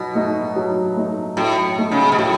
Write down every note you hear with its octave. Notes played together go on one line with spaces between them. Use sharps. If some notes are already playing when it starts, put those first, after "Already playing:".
Already playing: B2 F#3 D#4
A3 D#4
F#3
A3 D#4
A2 F#3
A3 D#4
C#3
B2
A2 F#3